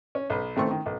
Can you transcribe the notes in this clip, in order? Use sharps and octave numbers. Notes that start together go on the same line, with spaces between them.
C#4
B1 B4
A1 D#3 A3 C4 C#6
D#3
B1